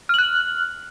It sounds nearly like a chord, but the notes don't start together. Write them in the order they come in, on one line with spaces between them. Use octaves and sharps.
F6 F#7 F#6